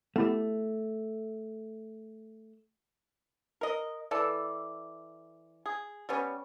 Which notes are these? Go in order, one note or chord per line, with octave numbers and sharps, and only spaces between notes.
A3 B3 E4 G4
A#4 D#5
E3 A4 D5
G#4
G3 B3 C#4